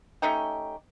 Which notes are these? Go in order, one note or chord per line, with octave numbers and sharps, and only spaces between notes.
A3 C#4 D#4 G4